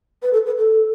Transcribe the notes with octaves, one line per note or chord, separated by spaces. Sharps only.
B4
A4
B4
A4